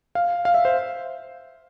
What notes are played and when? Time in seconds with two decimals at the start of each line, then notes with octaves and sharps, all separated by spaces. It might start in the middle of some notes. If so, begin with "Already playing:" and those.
0.15 F5
0.45 F5
0.54 E5
0.65 C5